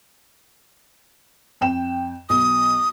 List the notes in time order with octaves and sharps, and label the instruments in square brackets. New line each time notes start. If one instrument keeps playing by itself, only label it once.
[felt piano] F2 G5 E7
[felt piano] B1 [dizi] D#6